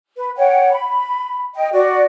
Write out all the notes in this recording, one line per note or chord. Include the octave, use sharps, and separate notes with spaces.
B4
C#5 F#5 G5
B5
D#5 G5
F#4 D5